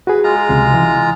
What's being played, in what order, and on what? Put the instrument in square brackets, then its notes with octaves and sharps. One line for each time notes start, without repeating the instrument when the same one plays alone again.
[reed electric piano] F#4 G#4 [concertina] B4
[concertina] G#3 F4 A#5
[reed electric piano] C#2 C3
E3